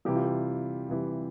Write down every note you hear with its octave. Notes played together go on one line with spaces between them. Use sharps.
C3 E3 G3 G4
F4
G4
C3 E3 G3